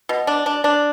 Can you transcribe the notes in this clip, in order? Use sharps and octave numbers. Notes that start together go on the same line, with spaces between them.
B2
D4
D4
D4